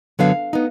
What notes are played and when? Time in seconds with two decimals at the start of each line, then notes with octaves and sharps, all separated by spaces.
0.19 F#2 D3 F#3 B3 F5
0.53 B3 D#4